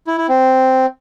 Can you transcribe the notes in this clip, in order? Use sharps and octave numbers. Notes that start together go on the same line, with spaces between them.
E4
E4
C4